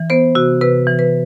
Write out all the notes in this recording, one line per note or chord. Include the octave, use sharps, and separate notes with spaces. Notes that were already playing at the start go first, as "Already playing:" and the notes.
Already playing: E3
B3 C5
C3 F#4
C3 B4
E3
B4